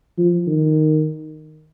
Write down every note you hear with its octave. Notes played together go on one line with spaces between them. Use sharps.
F3
D#3